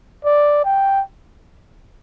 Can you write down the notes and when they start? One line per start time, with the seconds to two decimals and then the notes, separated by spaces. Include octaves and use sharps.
0.25 D5
0.65 G5